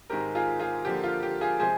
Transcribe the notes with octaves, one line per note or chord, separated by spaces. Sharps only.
G#2 D#3 G#3 C4 G4 A#4
F4 G#4
F4 G#4
D3 F3 A#3 G4
F4
G4
F4 G#4
C3 F3 G#3 C4 G#4 C5